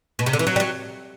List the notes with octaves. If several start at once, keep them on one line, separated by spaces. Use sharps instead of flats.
B2
C3
D3
E3
F#3
G3
F#3